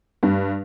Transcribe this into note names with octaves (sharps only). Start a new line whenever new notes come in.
G2